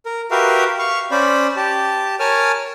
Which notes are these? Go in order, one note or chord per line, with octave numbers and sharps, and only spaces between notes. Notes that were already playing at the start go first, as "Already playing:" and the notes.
A#4
F#4 G4 A#4 B4 E5 F5
F5 C#6
C#4 C5 D5 B5
G4 A5
A#4 C#5 G#5 A5 F6